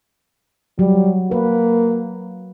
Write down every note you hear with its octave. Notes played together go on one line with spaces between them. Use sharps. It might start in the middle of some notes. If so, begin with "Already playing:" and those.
F#3 G3
A#3 B4